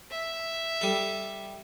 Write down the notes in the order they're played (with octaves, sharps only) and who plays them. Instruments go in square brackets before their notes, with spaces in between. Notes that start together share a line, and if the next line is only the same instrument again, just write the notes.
[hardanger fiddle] E5
[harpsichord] G3 A4